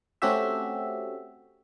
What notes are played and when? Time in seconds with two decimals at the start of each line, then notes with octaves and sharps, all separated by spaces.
0.22 A3 C4 C#4 F#4 G4 E5